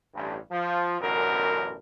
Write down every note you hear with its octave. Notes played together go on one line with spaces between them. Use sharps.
A1 G2
F3
A1 F#2 B2 D3 A#4